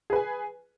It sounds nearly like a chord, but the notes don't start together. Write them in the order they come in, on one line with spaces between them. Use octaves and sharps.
G#4 B4 G#5